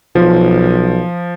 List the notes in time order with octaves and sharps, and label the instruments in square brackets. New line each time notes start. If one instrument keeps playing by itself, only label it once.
[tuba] B1 [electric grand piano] F3